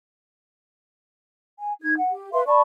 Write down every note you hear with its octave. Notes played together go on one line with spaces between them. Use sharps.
G#5
D#4 G#6
F#5
G4
B4 E5 F5 C6
D5 A5 B5 C#6